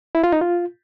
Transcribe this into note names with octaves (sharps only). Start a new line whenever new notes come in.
E4
F4
D#4
F4